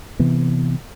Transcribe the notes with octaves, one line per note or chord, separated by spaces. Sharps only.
C3 E3 B3